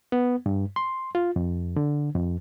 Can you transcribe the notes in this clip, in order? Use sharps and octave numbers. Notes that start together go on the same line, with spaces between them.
B3
G2
C6
F4
F2
D3
F2